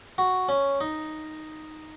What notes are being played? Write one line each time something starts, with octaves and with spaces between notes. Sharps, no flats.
F#4
C#4
D#4